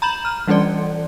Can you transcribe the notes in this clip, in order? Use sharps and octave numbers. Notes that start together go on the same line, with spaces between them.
A#5 B5 G6 E7 F#7
F6
E3 G3 C#4 A4 D5